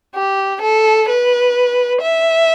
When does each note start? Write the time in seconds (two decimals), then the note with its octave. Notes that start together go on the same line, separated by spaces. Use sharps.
0.15 G4
0.62 A4
1.09 B4
2.02 E5